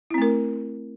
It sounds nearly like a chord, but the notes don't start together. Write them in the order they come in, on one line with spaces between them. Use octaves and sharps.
E4 C4 A3 A#4